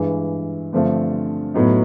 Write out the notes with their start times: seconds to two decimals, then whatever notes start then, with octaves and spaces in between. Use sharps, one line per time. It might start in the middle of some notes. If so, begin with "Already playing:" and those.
Already playing: G2 E3 G#3
0.73 G2 D3 F3 A3 C4
1.54 A2 F#3 B3 D#4